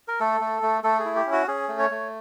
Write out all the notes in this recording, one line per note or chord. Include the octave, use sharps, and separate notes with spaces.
A#4
A3 A4
A3
A3
A3 A4
G#4
E4
G4
C#4
F#4
C#4 G#4
A3
C#5
A3